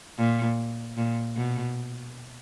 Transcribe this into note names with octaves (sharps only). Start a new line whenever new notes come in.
A#2
A#2
B2